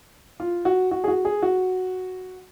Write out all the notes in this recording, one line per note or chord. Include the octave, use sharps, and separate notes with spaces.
F4
F#4
F#4
G#4
F#4
G#4
F#4